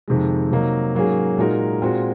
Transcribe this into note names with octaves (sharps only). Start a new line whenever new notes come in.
F2 C3 D#3 G#3
C3 F#3 A#3 D#4
G#2 F#3 A#3 C#4 G#4
A#2 G#3 D#4 F#4 A#4
A#2 G#3 C4 F#4